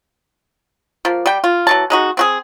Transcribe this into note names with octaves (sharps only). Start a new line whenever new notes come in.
F3 A#3
G3 G5
F4
E3 F#3 A5
G#3 D#4 F#4
C4 F#4 G#4